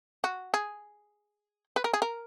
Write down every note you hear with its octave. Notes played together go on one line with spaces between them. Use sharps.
F#4
G#4
B4
A#4
G#4
A#4